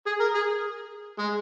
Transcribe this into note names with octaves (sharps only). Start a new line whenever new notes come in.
G#4
A#4
G#4
G#3